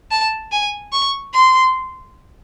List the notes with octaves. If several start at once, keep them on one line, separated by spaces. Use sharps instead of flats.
A5
G#5
C#6
C6